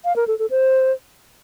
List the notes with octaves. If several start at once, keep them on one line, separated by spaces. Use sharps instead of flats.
F5
A#4
A4
A4
C5